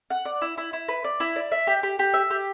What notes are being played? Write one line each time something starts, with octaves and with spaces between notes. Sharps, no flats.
F#5
D5
E4
E4
E4
B4
D5
E4
D5
E5
G4
G4
G4
E5
G4